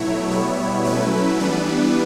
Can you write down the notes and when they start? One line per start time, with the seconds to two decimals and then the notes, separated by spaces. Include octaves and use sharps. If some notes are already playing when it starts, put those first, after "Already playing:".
Already playing: B2 F#3 A3 E4 C#5
0.31 B2 G3 B3 E4
0.85 F#3 A3 C#4 E4 B4
1.40 E3 G3 B3 D4